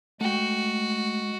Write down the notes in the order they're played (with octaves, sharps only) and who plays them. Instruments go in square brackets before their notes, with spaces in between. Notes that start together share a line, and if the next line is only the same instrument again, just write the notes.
[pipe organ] G#3 [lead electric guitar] A3 G5 [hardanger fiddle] F#4